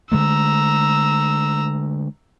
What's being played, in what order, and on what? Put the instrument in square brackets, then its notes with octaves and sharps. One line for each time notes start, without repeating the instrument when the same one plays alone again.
[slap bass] D3 G#3 A3 [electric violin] A#5 E6